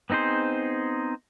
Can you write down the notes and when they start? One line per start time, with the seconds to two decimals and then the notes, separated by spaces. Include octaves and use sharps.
0.10 B3 C4 D#4 G#4 C5